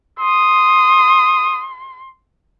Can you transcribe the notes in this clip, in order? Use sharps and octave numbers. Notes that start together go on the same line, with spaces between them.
C6 D#6